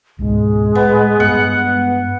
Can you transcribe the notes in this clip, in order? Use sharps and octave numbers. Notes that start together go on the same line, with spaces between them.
C#2 G#2 B2 G#3
A2 B3
G2 B3 F#5